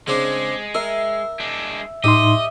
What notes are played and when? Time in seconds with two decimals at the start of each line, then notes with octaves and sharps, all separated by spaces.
0.08 C#3 G#3 C4 D4
0.75 A#4 E5
1.40 G#3 D4
2.04 A2 D#4 G4 D#5 E5 C6